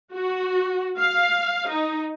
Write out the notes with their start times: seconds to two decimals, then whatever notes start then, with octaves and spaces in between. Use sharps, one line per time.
0.13 F#4
0.99 F5
1.70 D#4